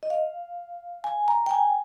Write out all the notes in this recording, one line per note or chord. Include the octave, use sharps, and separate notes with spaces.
D#5
F5
G#5
A#5
G5
G#5